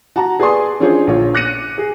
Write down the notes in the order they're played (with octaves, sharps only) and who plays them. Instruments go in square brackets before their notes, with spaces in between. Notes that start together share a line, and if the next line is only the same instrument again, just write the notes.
[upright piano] F#4 A5 A#5
G#4 B4 D5 G#5 C6 D#6
C#4 D4 F4 G#4 C5 C#5
A#1 D3 F4 C#5
D6 F#6 A#6 C#7 D#7
G#4